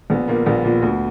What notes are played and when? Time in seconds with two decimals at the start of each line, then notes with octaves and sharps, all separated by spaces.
0.10 A#1 B3
0.28 A#2 A#3
0.46 A#1 B3
0.65 A#2
0.82 D2